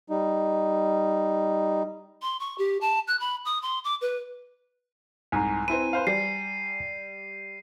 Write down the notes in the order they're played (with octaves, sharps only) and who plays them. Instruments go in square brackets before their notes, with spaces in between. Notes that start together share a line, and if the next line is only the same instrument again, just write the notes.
[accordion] G3 D#4
[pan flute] C6
C#6
G4
A5
F#6
B5
D#6
C6
D6
B4
[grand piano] C2 G#2 [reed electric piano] G#5 A#5
[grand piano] C4 E4 B4 [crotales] D#7
[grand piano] B4 C5 F5
[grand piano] G3 [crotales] C7